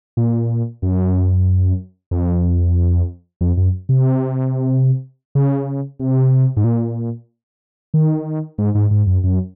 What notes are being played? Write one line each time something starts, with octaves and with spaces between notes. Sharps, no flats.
A#2
F#2
F2
F2
F#2
C3
C#3
C3
G#2
A#2
D#3
G#2
G#2
G#2
F#2
F#2